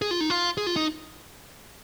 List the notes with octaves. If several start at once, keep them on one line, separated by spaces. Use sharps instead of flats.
G#4
F4
D#4
F4
G#4
F4
D#4